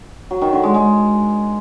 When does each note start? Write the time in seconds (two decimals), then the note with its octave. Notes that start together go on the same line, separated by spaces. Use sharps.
0.31 F#3
0.42 D#3
0.52 D3
0.63 G#3
0.74 G#3